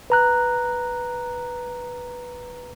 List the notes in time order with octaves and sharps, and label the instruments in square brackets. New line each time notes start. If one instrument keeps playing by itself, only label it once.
[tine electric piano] B4 A#5 F#6